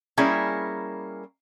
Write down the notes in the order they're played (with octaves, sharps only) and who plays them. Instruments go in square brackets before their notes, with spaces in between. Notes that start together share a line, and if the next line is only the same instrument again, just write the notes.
[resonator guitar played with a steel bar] G3 A#3 C#4 E4 G#4 A#4